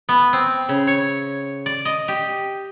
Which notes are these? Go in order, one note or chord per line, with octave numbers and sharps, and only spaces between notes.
B3
C4
C#3
C#5
D5
D#5
G4